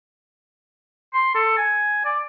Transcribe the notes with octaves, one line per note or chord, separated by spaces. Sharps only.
C6
A4
G#5
D5